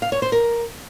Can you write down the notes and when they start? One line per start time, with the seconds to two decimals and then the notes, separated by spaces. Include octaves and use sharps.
0.02 F5
0.12 C#5
0.22 C5
0.32 A#4